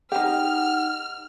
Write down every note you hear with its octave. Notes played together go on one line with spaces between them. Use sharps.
D#4 G4 F#5 F6